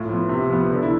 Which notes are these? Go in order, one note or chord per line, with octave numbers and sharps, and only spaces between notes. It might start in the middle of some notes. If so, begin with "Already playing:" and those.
Already playing: A2 F4
F3 B3
C3
F3 B3
D3
E4